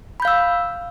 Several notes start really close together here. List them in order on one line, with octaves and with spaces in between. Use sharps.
B5 G6 F5 E6